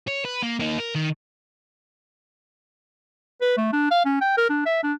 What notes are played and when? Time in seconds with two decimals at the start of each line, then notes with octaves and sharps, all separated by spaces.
0.08 C#5
0.25 B4
0.43 A#3
0.60 A#3 D#4
0.78 A#4
0.95 D#3
3.41 B4
3.58 A3
3.73 D4
3.91 F5
4.05 C#4
4.22 G5
4.37 A#4
4.50 D4
4.66 E5
4.83 D4